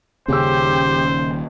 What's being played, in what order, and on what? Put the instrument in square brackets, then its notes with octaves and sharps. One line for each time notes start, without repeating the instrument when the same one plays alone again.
[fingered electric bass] D#1 D#2 C#4 [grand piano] C#3 G5 E6 [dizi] G4 [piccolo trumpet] C5